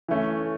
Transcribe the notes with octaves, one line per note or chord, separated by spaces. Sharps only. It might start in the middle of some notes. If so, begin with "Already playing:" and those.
E3 A3 C#4